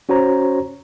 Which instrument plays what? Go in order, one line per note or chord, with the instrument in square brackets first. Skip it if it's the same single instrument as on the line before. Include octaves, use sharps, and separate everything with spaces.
[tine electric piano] C#4 F#4 C5 C#5 A#5